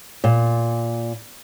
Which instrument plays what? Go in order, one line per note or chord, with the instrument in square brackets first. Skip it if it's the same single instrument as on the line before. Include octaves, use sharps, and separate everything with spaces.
[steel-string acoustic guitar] A#2